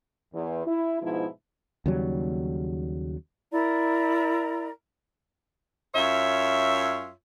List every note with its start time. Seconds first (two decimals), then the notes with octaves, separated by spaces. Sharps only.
0.34 E2
0.65 E4
1.02 G#2 B2 F3 E4
1.86 D#2 C#3 F#3 G3
3.52 E4 A#4 D5 A#5
5.95 F#2 F4 C#5 E5